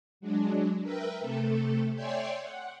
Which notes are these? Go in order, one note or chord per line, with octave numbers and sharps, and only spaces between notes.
F#3 G#3 D4
A#4 B4 E5 G5
C3 A3 A4
C#5 D5 E5 G5 G#5 C6
F#5